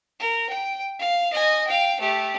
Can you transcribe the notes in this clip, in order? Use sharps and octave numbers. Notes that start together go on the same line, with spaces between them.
A#4
G5
F5
D#5 G#5
F5 G5
A3 G4